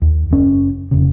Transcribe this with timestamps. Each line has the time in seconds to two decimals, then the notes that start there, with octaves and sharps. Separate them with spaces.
0.02 D#2
0.31 F#1 C#4
0.91 F1 C#3